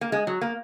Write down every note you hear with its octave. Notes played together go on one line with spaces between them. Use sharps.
A#3
G#3
F#3
A#3